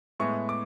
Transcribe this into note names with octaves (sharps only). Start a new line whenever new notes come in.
A2 G#3 B3 E4 C#6
D6